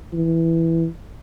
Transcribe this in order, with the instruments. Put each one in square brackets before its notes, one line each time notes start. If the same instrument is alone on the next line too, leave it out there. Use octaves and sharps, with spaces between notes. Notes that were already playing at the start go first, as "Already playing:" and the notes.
[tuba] E3